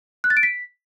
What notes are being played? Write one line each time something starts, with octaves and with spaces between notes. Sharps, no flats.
F#6
A6
D7
B6